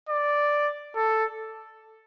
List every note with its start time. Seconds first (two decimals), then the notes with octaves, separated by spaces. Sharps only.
0.09 D5
0.95 A4